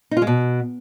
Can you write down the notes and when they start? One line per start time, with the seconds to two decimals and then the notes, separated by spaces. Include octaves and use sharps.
0.11 D#4
0.17 F4
0.22 G#3
0.27 B2